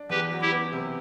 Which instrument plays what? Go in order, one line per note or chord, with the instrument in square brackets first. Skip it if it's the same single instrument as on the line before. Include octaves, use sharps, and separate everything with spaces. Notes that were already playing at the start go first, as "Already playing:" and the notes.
Already playing: [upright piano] D4
[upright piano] E2 [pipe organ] G4 B4
[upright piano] F#3
[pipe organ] E4 G4
[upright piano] B3
C3